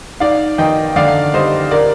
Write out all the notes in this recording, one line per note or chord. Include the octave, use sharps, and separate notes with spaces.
D#4 D5 F5
D#3 D#5 G5
D3 D5 F5
G3 C5 D#5
A#4 D5